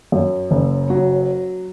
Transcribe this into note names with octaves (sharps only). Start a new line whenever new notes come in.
F#2
F#1
F#3